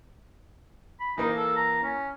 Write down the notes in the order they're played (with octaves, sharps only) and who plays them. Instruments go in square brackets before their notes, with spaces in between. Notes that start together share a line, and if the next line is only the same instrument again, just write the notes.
[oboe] B5
[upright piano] E3 A#3 [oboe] D#4
[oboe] A4
A#5
C#4